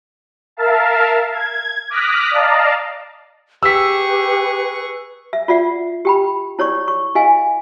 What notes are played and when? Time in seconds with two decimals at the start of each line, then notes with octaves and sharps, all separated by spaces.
0.57 A#4 E5 F5 A5
1.33 G#6
1.90 D6 D#6 F6 F#6 A#6 B6
2.31 D5 D#5 F5 A5 A#5
3.63 G4 G#4 B4 C#6 E6 B6
5.33 E5
5.48 F4 D5 E5 F#5
6.05 G4 G5 B5
6.59 E4 C#5 D5 C#6
6.88 C#6
7.15 E4 D#5 F5 G#5